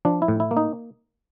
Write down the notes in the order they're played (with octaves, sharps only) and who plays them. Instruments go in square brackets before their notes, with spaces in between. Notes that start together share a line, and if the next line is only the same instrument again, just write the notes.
[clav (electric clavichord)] F3 D4
E4
A2
E4
A#3
D#4